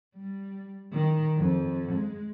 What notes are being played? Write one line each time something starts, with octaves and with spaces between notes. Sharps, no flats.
G3
D#3
F2
G#3